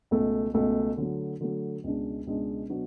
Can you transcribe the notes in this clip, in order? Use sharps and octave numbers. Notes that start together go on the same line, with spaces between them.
C#2 B2 A3
C#2 B2 A3
D3 F#3 A3
D3 F#3 A3
C#2 B2 G#3 D4
C#2 B2 G#3 D4
B2 F#3 B3 D4 F#4